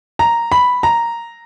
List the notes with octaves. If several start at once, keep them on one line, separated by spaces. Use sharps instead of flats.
A#5
B5
A#5